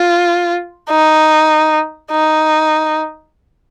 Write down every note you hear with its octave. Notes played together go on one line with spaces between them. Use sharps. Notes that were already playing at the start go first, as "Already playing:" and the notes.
Already playing: F4
D#4
D#4